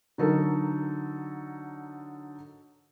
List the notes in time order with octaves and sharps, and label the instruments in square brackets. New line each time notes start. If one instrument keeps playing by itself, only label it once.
[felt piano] D3 F#3 D#4 A4 A#4